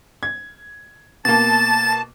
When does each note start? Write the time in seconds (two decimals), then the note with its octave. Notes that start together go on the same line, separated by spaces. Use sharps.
0.23 G#6
1.25 B2 A#3 A5 A6